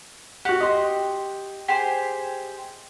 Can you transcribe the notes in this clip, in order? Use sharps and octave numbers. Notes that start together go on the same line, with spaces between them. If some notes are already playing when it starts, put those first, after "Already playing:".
F#4 G4 F#5
D#5 C6
G4 G#4 C5